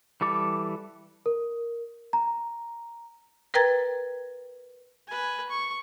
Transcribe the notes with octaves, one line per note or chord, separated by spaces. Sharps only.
E3 G3 A4 D6
A#4
A#5
A#4 B4 G5 A#5 G#6 A6
B4 G#5
C#6